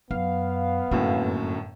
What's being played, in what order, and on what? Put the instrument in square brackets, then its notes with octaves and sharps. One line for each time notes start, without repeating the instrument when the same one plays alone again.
[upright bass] F#2 [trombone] B3 [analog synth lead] F5
[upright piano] G1 F#2 A2 [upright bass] A#3